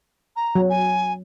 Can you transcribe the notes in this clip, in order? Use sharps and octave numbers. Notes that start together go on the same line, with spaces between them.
A#5
F#3
G#5